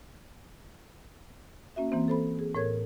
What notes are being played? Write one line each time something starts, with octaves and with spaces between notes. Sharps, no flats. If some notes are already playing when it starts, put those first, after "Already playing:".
A#3 C#4 F#4 E5
E3 A#3 C4 C5
A4 C5 B5
G#4
A2 A#4 C#5 G#6